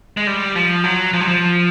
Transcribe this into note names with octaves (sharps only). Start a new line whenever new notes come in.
G#3
G3
F3
F#3
F3
F#3
F3